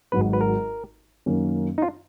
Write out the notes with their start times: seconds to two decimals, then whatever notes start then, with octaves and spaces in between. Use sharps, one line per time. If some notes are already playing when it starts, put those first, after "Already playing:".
0.12 G#1 G#2 F#3 B4
0.33 B4
0.41 A#4
1.26 F#2 D#3 A#3 C#4
1.78 D#4
1.82 F4